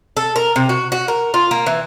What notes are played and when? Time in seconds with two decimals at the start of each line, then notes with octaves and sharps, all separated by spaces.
0.17 A4
0.36 A#4
0.56 C3
0.69 F#4
0.92 F#4
1.08 A#4
1.34 F4
1.51 A#3
1.66 E3